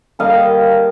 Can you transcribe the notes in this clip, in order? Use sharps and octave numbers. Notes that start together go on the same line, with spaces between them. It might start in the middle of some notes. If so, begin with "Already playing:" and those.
D3 G3 A#3 D#5 F5